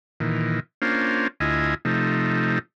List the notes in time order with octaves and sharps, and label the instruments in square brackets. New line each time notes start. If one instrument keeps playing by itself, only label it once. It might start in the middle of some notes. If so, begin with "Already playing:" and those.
[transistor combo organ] A#2 D#3 E3
A#3 C#4 D4 F4 C5
D2 E4 F4 D#5 G#5
C3 F3 A3 D#4